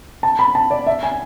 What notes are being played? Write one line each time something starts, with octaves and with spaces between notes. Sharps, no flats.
A5
B5
A5
D5
E5
G#5